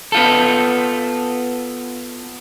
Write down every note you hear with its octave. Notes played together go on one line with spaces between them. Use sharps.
B3 F4 A4